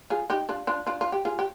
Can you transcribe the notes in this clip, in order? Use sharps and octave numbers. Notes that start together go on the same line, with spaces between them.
F4 G#4
D#4 G4
D4 F4
D4 F4
D4 F4
F4
G4
F4 G#4
G4